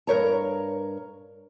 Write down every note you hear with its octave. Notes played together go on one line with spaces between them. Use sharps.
G2 A#4 C#5 A#5